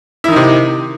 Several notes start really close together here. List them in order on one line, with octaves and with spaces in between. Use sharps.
E4 D#3 D#4 C3